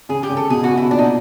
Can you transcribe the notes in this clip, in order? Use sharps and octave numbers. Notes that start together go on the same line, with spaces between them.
C#3 G#4
G4
C#3
A4
B2 G#4
F#4
B2
E4
A#2 D4
D#4